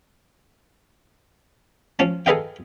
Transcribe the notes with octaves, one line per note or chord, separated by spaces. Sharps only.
F3 C#4 A5
G#4 A4 B4 D#5 F5 G5